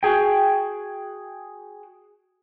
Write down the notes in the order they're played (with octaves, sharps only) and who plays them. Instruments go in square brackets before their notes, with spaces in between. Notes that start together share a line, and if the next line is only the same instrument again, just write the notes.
[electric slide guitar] F#4 G#4 G5